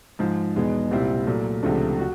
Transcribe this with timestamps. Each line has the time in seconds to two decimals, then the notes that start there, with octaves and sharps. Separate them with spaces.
0.19 G#2 F3 G#3
0.55 E2 B2 G#3 B3 D#4
0.91 C2 A#2 G3 C4 E4
1.27 A#2 F#3 A3
1.63 C#2 C3 F3 A3 D4
1.99 F#4